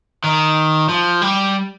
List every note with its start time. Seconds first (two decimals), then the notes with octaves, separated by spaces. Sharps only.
0.24 D#3
0.89 F3
1.22 G3